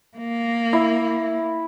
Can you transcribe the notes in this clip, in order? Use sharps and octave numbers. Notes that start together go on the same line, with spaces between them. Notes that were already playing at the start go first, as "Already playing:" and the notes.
A#3
E4